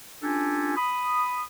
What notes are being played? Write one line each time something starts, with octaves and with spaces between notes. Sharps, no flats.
C#4 D4 F4 G4 A4 G#5
B5 D#6